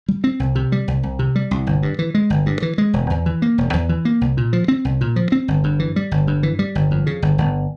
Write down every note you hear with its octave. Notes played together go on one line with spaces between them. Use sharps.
G3
C4
C2
C3
G3
C2
C2
C3
G3
C2
G1
G2
E3
G#3
G1
G2
E3
G#3
E1
E2
E3
A#3
E1
E2
E3
A#3
C2
A#2
F3
C4
C2
A#2
F3
C4
G1
G2
E3
G3
G1
G2
E3
G3
G1
F2
C#3
G1
G1